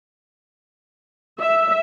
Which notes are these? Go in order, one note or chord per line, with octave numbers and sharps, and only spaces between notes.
E5